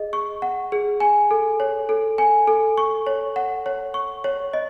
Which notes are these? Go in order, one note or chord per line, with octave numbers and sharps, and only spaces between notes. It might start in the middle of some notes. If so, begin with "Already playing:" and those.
Already playing: G#4 D#5
C#6
F#5
G#4
G#5
A4
C#5
A4
G#5
A4
C#6
C#5
F#5
C#5
C#6
C#5
D#5